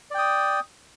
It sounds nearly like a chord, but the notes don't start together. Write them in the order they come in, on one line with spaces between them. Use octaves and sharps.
D5 G5 D#6